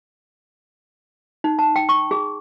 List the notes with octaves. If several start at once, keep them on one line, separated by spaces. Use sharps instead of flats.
D#4
A5
G5
C#6
G#4